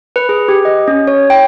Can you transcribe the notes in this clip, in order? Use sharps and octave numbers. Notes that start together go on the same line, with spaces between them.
B4
G#4
G4
D#5
C#4
C#5
G5